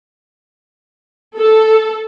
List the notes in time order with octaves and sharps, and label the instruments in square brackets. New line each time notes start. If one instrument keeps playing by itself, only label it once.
[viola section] A4